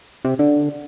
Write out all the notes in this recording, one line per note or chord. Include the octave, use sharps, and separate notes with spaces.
C3
D3